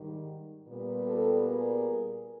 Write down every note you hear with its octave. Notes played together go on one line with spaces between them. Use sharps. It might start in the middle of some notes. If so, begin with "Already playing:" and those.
Already playing: G#2 D#3 G3
A#2 G3 B3
G4 A4
G#4 A#4